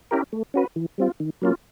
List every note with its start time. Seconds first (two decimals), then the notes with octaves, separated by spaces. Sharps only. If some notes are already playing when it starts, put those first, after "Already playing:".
0.11 C#4 E4 G4 A#4
0.33 A3
0.54 C#4 F#4 B4
0.76 E3
0.98 G3 C4 F4
1.20 D#3
1.42 F#3 A#3 C#4 F4